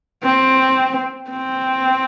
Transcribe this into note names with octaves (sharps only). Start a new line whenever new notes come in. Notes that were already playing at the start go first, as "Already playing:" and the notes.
C4
C4